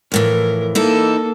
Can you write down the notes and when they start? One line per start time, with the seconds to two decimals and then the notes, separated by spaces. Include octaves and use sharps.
0.12 F2 A2 E3 A#4
0.75 E3 A#3 D#4 E4 A4